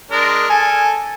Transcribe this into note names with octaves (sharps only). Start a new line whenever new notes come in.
G#3 D4 A#4
A4 G#5